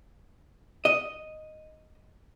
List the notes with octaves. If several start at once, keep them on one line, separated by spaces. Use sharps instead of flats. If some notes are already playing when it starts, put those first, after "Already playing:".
D#5